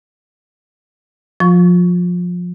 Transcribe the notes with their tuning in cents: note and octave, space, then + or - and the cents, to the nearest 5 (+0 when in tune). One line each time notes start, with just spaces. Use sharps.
F3 +20 F4 +35 C#6 +20